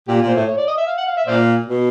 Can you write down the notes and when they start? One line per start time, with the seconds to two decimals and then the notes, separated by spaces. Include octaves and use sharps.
0.08 A#2 G4
0.21 A#2
0.28 C5
0.35 A2
0.48 C#5
0.57 D5
0.67 D#5
0.78 E5
0.87 F5
0.97 F#5
1.07 F5
1.17 E5
1.27 A#2 C5 D5 F5
1.66 B2